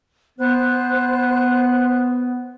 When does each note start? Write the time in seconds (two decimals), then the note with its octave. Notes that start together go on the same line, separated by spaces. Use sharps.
0.39 B3 C5 F#6